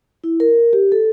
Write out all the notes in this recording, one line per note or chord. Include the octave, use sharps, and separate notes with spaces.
E4
A#4
G4
A4